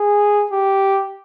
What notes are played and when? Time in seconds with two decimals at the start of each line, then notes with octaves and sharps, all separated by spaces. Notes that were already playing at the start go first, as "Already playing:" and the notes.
Already playing: G#4
0.51 G4